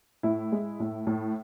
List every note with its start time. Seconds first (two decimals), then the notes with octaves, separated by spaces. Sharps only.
0.23 A2 E4
0.52 G#3
0.80 A2
1.07 A2